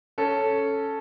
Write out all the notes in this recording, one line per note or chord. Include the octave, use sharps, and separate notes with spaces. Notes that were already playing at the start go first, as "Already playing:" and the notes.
C#4 A4